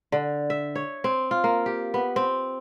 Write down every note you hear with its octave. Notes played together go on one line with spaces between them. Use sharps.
D3
E5
C#5
C4
F4
A#3
G4
B3
C4